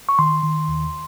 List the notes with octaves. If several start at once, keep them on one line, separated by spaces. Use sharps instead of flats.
C#6
D#3 C6
D#3
D#2